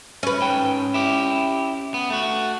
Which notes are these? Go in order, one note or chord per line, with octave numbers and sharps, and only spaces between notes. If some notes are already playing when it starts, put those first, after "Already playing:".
C#4 B4
G#2 G5
E4 G4
B3
A3 F#4